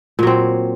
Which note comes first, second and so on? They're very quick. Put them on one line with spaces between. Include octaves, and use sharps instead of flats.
A#2 F#3 C4